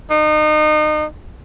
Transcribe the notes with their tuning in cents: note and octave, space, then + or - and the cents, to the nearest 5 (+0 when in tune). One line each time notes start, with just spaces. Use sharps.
D#4 -30